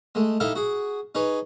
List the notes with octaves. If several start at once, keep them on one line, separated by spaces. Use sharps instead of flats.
G#3 A3
D#4 E4 G4 A4 E5 F5
F#4 G#4
D#4 G#4 B4 C#5